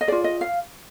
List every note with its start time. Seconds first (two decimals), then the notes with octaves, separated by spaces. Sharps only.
0.01 D#5
0.08 F4 G#4 D5
0.24 D#5
0.41 F5